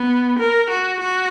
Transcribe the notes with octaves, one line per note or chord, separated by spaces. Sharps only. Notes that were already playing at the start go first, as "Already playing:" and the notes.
Already playing: B3
A#4
F#4
F#4